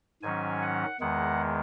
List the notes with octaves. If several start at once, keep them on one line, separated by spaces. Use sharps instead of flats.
G#2 D#3 F#3 C#4 G#5
F#5
E2 D#3 G#3 F#5